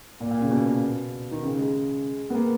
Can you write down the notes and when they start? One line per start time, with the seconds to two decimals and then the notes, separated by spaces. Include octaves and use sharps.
0.20 A#2
0.31 A#2
0.41 C#3
0.51 B2
0.66 B2
1.31 D#3
1.43 C#3
1.59 G#3
2.30 B3
2.35 A#3